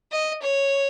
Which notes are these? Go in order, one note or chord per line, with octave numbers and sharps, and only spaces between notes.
D#5
C#5